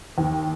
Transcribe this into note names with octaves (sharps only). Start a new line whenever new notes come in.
D#2